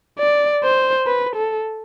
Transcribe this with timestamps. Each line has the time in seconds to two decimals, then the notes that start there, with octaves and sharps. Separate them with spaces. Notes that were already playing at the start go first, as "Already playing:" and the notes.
0.19 D5
0.63 C5
1.07 B4
1.36 A4